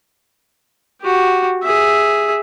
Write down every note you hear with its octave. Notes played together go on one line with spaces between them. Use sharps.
F#4 G4
G#4 E5